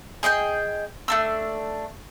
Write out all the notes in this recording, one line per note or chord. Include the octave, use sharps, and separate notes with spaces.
G#4 D#5 F5 G5
A3 D4 E6